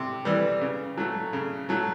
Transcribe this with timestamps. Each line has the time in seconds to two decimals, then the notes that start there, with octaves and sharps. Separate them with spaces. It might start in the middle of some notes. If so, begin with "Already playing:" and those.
Already playing: C3
0.25 E3 G3
0.61 C#3
0.97 F#3 A3
1.33 C#3
1.69 F#3 A3